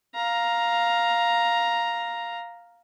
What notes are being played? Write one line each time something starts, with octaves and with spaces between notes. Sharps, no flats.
F5 A#5